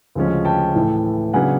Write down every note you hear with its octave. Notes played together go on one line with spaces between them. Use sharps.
D2 C#3 F3 G#3 C#4
G5 A5
A2 E3 A3
C#3 F#3 B3 D4 F#5 G#5